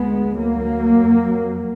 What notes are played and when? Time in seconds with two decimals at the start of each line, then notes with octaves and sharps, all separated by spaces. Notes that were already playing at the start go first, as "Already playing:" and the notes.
Already playing: D2 G#3 B3
0.38 F#3 A#3
1.00 F2